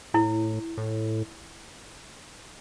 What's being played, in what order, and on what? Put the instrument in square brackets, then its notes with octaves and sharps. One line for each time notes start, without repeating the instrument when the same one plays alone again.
[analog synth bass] A2 [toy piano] E4
[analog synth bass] A2